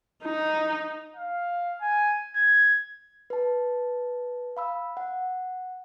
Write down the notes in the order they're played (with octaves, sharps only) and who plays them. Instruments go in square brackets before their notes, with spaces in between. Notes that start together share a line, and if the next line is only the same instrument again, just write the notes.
[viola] D#4
[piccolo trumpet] F5
G#5
G#6
[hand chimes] B4 A5
F5 B5 E6
F#5